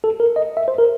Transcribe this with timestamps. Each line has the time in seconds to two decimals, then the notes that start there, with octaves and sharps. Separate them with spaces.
0.04 A4
0.20 A#4
0.36 D#5
0.57 E5
0.68 C5
0.78 A#4